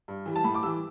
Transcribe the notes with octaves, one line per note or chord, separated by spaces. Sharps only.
G2
E3 G3
A5
A2 B5
D6
E3 G3 E6